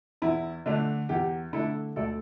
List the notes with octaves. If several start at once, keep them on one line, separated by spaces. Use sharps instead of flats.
E2 E4
D3 A3 D4
E2 G4
D3 A3 D4 E4 A4
D2 A4 D5